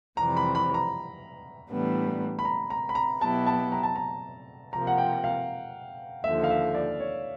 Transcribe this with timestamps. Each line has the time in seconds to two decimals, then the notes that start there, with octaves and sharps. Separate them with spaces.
0.17 F2 C3 E3 G3 C4 A#5
0.37 B5
0.55 B5
0.74 A#5
1.70 A2 E3 G3 B3 D4
2.39 B5
2.45 A#5
2.70 A#5
2.89 B5
2.95 A#5
3.21 B2 F#3 B3 E4 G4 A5
3.46 A5
3.72 A#5
3.83 A5
3.96 A#5
4.73 C3 F3 A#3 A#5
4.87 F#5
4.98 G5
5.24 F5
6.24 D#2 D3 F3 E5
6.44 F5
6.50 E5
6.74 D5
7.00 C#5